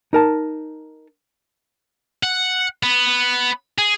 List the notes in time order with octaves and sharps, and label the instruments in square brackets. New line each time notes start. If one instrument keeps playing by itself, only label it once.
[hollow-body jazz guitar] D#4 A#4 A5
[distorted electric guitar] F#5
B3
G#4